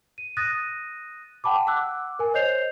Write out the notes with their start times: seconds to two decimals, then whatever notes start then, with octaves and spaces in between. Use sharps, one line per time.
0.18 D#7
0.37 D#6 F#6 A6 A#6 D#7
1.44 F#5 G5 A5 B5 D6
1.67 F#5 D6 E6 F#6
2.19 A#4 G#5
2.34 C5 C#5 D#5 G6 C7 F7